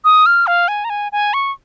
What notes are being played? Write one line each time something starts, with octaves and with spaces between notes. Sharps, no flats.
D#6
F6
F5
G#5
A#5
G#5
G#5
C#6